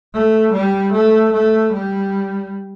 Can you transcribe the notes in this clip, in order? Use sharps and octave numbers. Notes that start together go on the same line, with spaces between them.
A3
G3
A3
A3
G3